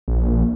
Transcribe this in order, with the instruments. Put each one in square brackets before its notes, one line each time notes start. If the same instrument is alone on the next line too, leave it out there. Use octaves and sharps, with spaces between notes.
[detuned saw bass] A#1